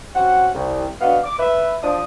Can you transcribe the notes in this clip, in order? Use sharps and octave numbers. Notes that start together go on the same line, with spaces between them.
C4 C#4 F#4 F#5
C2
B3 D4 F#4 D#5 F5
D6
B4 E5
F3 D4 D#6